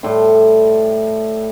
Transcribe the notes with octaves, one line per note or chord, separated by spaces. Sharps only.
A2 G3 A4 C6